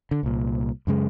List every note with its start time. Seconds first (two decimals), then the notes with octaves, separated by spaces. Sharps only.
0.11 D3
0.23 C2 A#2
0.87 F#2 C#3 G#3